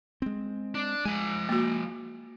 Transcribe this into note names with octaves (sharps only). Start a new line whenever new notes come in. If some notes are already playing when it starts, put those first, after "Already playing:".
G#3 C4
D4
F3 G#3 G#5
A#3 F#4